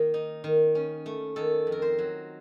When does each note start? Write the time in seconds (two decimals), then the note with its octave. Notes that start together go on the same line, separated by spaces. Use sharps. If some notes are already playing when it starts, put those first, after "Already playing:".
Already playing: D#3 A#3
0.14 D#4
0.44 D#3
0.75 C#4
1.06 A3
1.36 D#3 A4
1.67 F2
1.72 A#4
1.82 C5
1.99 F#3